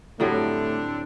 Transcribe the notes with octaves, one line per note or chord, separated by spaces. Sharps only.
A2 D3 F#3 G3 A3 C4 D4